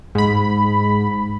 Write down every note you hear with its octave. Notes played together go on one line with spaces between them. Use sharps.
G#2 B5